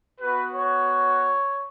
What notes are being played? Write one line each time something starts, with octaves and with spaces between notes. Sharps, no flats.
B3 F#4 B4
C#5